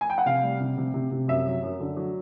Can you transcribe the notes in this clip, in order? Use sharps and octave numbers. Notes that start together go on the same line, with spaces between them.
G#5
G5
F#5
C3 F5
G3
C3
C3
C3
C3
F#2 E5
F#3
F#2
D3
F#3